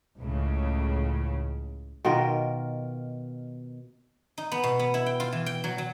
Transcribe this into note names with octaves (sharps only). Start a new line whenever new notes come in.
C#2 A2 C#3
B2 D#3 F4 A#4
D#4
B3
B2
B3
E4
G5
F4
E3
G5
F#3
F#3